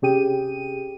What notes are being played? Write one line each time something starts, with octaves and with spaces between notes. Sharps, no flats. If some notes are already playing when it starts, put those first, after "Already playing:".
C3 C#4 G4 G#4 G5 D#7